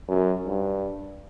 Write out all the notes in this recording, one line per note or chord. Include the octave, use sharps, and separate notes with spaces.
F#2
G2